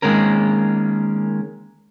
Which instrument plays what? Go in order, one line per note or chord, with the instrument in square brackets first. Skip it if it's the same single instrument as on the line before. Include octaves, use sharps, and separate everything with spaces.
[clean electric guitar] D#3 G#3 A#3 C#4 A#4